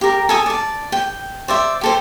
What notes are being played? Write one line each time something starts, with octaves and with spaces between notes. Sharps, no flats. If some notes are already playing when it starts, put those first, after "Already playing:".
G4 A#4
A4 G#5 D#6
D5 A5
G5
C5 D5 E5
G4 A4 C5